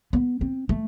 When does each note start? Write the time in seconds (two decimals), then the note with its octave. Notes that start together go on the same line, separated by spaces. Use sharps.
0.13 B3
0.41 C4
0.69 A3